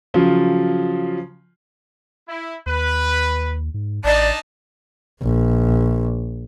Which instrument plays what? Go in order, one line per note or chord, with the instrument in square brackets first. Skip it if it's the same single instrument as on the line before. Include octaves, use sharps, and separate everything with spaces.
[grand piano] C#3 F3 F#3 F4
[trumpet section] E4
[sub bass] D#2 [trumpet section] B4
[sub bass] G#2
[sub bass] A1 [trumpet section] D4 D#4 A5 [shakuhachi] D5
[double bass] A#1